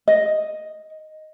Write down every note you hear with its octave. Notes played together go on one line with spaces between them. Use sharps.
D#5